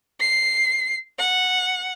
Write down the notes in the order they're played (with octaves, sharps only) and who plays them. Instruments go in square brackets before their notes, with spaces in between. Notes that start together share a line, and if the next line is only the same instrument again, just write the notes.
[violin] C7
F#5